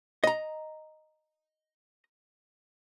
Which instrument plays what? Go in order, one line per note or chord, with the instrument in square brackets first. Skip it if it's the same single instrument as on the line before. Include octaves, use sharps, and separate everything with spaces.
[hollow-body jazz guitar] D#5 A#5